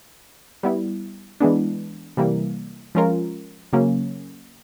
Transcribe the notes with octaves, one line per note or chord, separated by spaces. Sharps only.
G3 B3 E4
E3 G#3 B3 D4
C3 E3 G3 A#3
F3 G#3 C#4 F4 A#4
C#3 F#3 A#3 C#4